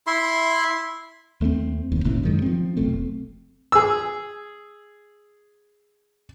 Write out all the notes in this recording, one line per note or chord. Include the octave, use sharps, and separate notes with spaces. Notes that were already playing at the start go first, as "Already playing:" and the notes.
E4 E5 C6
D#2 A3 A#3 C4
F1 D#2
G#1 A#2 C#3 E3
F#2 D#3 G#3
F3 C4
F1 B1 A3 C4
G#4 E6